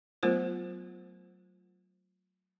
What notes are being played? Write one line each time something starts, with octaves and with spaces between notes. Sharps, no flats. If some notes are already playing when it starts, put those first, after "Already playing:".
F#3 A3 B3 F4 A#4 C5